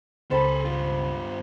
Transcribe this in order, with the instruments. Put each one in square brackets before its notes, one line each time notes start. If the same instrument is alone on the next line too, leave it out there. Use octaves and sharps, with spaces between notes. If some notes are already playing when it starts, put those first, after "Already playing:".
[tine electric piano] C#2 C#3 [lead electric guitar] G#4 A4 [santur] C5 A5 B5
[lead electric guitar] G2 F4